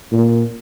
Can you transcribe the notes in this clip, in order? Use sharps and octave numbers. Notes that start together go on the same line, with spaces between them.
A#2